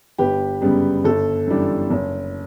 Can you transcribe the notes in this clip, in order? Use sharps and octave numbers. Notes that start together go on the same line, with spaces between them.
G1 G4 B4
F#2 C#3 G3 B3
G1 A4
F#2 E3 G3 D4
F#1